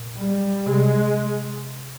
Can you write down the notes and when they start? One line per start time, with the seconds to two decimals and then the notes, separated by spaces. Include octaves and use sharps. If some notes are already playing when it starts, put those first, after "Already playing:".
Already playing: A#2
0.19 G3
0.66 C3 G#3